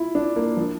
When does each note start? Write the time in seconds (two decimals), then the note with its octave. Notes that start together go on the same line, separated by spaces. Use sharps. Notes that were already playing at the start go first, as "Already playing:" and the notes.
Already playing: E4 F4
0.15 D4
0.36 A#3
0.57 F3